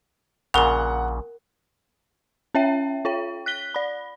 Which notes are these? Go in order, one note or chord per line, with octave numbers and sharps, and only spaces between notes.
A#1 A#2 C#3 A#4 F#5 F7
C#4 C#5 E5 G5
F4 C#5 G5
F#6 B6 G7
D5 B5